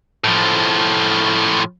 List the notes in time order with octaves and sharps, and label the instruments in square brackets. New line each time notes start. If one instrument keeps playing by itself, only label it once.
[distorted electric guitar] A2 F3